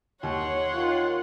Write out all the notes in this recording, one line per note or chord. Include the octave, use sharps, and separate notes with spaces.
D#2 C#5 F#5 C6
D#3 F4